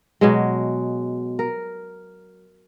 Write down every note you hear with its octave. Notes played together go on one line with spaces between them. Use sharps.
B2 F#3 G#3
A#4